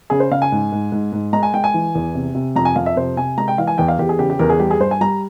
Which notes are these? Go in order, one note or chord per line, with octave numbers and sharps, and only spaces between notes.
C#3 G#4
C5
C#3 F5
G#5
G#2
G#2
G#2
G#2
G#3 A#5
G#5
G#3 G5
G#5
E3
E2
C3
C3
F2 A#5
G#5
F2 F5
E5
C3 C5
C3 G#5
G#3 A#5
G5
E3 F5
G#5
E2 G5
F5
E2 G4
G#4
C#3 G4
G4
E2 A#4
G#4
G3 G4
G#4
G2 C5
G#5
G3 A#5